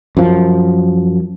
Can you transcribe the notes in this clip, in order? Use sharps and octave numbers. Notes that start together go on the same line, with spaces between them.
F#2 F3